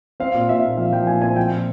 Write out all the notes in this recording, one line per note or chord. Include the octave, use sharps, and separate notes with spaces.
C4 F5
A#2
A#2 E5
A#2
F3 F5
F3 G5
A#2 G#5
C4 G#5
F3 G5
A#2